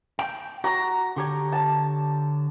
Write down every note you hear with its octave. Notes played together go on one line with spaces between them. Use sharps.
G5
F#4 A#5
D3 G4 C#5
A5